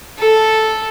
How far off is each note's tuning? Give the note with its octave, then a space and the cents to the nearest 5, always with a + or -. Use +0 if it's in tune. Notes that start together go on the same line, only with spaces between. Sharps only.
A4 -5